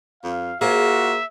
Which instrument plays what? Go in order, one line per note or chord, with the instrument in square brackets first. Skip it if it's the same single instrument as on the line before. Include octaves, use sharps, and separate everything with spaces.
[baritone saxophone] F2 [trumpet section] F5
[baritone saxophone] A#3 [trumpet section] F4 F#4 [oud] G#4 C5 [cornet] E5